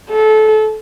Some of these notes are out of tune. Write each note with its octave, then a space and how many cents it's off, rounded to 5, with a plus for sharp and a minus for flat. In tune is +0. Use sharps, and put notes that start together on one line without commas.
A4 -25